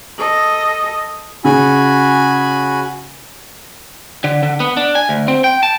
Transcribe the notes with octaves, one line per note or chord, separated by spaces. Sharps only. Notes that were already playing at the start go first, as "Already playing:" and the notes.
A4 D#5
C#3 F#4 G#5 B5
D3
D3
B3
D4
G#5
D2
C4
G5
A5